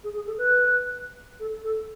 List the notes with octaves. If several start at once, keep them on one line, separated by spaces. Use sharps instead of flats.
G#4
G#4
A4
B4
A4
A4